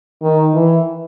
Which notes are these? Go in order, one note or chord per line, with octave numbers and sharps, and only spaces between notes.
D#3
E3